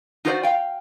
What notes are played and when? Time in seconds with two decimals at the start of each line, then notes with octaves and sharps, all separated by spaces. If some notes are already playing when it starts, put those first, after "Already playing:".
0.25 D#4 F4 F#4 A4 C5 D5
0.43 F5 G5